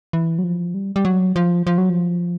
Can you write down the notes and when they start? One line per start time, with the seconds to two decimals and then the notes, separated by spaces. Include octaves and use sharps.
0.13 E3
0.39 F#3
0.44 F3
0.74 G3
0.96 G3
1.05 F#3
1.36 F3
1.67 F3
1.78 F#3
1.90 F3